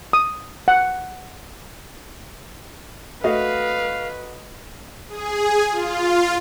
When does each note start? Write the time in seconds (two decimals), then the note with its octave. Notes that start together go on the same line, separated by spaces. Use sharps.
0.13 D#6
0.68 F#5
3.24 A3 F#4 B4 D#5 F5
5.09 G#4
5.72 F4